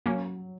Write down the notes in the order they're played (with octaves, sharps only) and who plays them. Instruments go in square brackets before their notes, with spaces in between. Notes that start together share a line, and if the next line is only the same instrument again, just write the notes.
[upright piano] F#3 [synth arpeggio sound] A#3 C#4